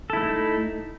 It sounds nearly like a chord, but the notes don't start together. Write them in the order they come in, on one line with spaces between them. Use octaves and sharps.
A4 E4 A3 D#4